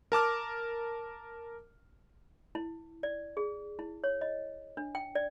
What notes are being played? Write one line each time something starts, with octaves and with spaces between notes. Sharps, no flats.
A#4 A5 D6 F6
E4
D5
G#4
E4
C#5
D#5
D4
G5
D5